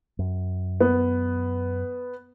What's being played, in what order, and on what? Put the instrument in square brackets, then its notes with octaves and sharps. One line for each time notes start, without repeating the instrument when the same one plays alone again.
[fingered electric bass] F#2
[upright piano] B3